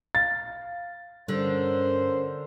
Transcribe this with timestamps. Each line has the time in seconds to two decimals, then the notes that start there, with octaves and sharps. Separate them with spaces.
0.15 F5 A6
1.28 G2 D3 C#4 A#4 C5